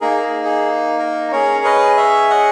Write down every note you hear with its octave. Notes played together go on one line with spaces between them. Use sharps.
A#3 D#4 G#4 A#4
G#4
G#4
A#4
C#4 G#4 A#4 C#5
B4 D#5
C#5 E5
D#5 F#5